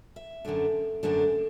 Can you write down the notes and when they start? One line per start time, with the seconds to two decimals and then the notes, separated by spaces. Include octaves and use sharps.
0.16 E5
0.45 F#2 D3 A3 D4
1.03 F#2 D3 A3 D4